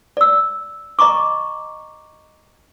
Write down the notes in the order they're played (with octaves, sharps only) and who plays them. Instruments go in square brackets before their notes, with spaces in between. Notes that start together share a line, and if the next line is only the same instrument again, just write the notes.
[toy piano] D5 E6
D#5 A#5 C#6 D6